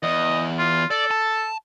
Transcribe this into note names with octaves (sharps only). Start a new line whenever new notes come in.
E2 D#5
F4
A4 D5
A5